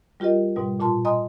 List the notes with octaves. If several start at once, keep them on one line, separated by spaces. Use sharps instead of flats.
G3 F4 G4 A#4 D#5
G#2 B2 G3
A#2 F4 A5 C6
D#5 G#5 A#5 C6 D#6